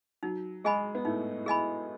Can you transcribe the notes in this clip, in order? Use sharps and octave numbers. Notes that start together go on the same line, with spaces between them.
F#3 D#4
G#3 G#4 D#5 G#5 B5
B3
A2 A3 D#4
G#4 D#5 G#5 B5